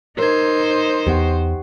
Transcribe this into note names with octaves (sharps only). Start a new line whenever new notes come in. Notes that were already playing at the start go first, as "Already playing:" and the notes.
D#4 A#4 C5 G#6
E2 B3 G4 F#5